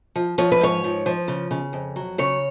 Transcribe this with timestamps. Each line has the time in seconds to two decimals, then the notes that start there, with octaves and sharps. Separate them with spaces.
0.16 F3
0.38 F3 C#5
0.52 B4
0.61 G#2 C#5
0.84 F3
1.06 F3
1.28 C#3
1.51 C#3
1.73 F2
1.96 F#3
2.18 C#3 C#5